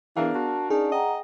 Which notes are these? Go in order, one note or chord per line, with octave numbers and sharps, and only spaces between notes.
E3 B3 D4 G#4 A#4 F5
F#4 A5
C#4 D#4 G#4 D5 A5
D#5 F#5 G5 A#5